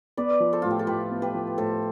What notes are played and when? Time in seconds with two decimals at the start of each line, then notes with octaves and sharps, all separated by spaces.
0.17 B3 B4 D5
0.40 F3
0.53 A4 C5
0.62 A2 F4
0.71 G4
0.79 A4
0.87 A2 G4 B4
1.11 B3
1.22 G4 B4
1.34 F3
1.58 A2 A4 C5